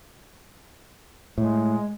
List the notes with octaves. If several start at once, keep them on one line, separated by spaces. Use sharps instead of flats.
A2 G#3